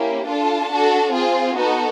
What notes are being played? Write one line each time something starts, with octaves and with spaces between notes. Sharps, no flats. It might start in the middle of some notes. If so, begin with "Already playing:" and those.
Already playing: A#3 C#4 E4 G4
D4 F4 A4 A5
D4 F#4 A4
C4 F4 G#4
B3 D#4 F#4 A4